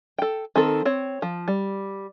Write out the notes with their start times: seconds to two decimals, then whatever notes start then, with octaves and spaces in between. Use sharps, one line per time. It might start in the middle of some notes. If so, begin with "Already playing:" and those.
0.19 A4 G5
0.56 D#3 C4 A4
0.85 C4 C#5
1.22 F3
1.48 G3